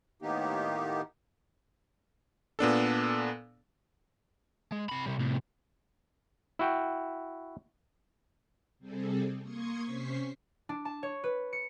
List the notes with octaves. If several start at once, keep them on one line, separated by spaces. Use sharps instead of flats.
A2 D#3 A#3 B3 D#4 G4
A#2 B3 D4 A4
G#3
C3 B5
C3 G3
A2 C3
E4 F#4 G5
C3 G3 C4 G#4 A4
A#3 C6 C#6 D#6 G#6 C#7
C3 C#4 C5 C#6 B6 C7
D4
A5
C#5
B4
C#7